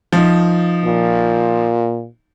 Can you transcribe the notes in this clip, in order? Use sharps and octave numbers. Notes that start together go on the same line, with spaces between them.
F3 D#4
A#2